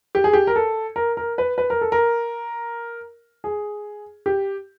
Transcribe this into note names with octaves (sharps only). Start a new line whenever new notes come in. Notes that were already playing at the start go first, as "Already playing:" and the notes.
G4
G#4
G4
A#4
A4
A#4
A#4
B4
B4
A#4
A4
A#4
G#4
G4